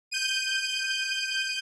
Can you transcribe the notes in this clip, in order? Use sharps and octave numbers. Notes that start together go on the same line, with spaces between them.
G6 D#7